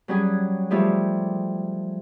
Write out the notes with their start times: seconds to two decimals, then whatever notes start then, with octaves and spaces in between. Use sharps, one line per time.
0.08 F#3 G3 C#4 G#4
0.70 F3 G3 A3 F4 G4 G#4